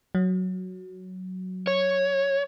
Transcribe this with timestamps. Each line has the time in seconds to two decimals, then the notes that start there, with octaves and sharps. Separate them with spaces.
0.15 F#3
1.67 C#5